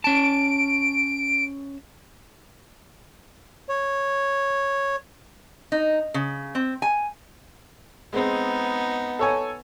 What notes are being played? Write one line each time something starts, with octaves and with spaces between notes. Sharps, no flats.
C#4 A5 D7
C#5
D#4
C#3
C4
G#5
G#3 B3 C4 D#4
A4 C#5 G#5